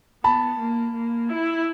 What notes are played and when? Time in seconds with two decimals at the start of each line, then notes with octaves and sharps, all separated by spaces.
0.24 B3 A5 B5
0.59 A#3
0.94 A#3
1.29 E4